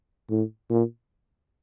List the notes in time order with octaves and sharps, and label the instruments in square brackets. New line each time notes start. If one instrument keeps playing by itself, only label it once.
[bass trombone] A2
A#2